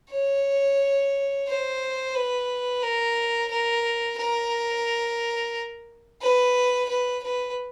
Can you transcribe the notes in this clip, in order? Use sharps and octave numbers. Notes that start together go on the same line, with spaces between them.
C#5
C5
B4
A#4
A#4
A#4
B4
B4
B4